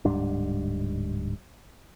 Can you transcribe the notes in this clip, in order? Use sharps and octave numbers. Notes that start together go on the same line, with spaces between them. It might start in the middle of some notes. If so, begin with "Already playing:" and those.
D1 G#2 G3 D4